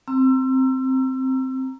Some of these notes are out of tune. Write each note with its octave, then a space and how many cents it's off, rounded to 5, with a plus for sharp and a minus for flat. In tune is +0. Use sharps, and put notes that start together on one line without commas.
C4 +0 A#5 +0 E6 +30